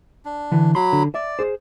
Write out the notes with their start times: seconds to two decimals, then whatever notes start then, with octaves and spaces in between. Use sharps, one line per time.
0.25 D4
0.52 D3 E3
0.75 F#3 B5 C6
0.93 D3
1.14 D5 E5
1.39 G#4 C5